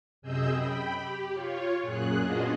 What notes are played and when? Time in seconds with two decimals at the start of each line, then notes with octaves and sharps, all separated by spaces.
0.22 F#2 C3 G#4 D#5 E6 G6
0.53 G5 B5
0.99 G4
1.33 F4 C#5
1.82 F#2 A#2 G#4 F#6
2.20 B3 D4 F4 F#4 G#4 D#5